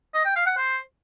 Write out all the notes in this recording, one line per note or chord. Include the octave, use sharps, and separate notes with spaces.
D#5
G5
F5
F#5
C5